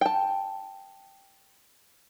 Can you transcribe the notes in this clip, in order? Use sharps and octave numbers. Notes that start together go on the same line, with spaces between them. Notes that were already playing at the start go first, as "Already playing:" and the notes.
G5 A5